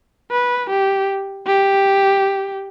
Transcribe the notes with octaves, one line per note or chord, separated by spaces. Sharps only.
B4
G4
G4